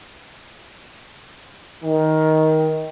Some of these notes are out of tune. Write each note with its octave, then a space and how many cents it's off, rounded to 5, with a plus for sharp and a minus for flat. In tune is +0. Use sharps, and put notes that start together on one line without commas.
D#3 +15